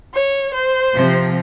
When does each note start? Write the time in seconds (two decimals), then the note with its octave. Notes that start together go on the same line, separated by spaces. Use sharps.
0.14 C#5
0.54 C5
0.95 C3 F3